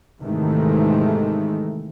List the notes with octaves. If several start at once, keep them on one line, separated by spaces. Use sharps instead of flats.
G#2 C3 D#3 E3 G#3 A3